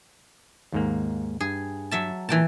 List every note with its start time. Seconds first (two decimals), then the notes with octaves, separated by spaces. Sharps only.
0.73 D#2 G#2 A#3
1.40 G2 G#4
1.91 F#3 E5 A5
2.29 A#2 E3 G5 A5